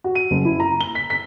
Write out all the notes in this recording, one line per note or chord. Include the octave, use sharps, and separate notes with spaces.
F#4
D#7
F#1
E4
A#5
G7
B6
B6